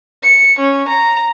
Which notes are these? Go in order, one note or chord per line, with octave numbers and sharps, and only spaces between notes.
C#7
C#4
A#5